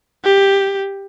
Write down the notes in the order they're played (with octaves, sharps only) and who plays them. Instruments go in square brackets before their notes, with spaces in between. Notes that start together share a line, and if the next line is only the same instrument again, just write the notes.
[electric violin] G4